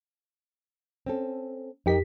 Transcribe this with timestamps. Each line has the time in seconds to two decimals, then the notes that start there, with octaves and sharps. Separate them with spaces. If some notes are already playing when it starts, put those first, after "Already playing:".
1.06 C4 C#4 A4
1.86 F2 D#4 G4 A#4 D#5 B6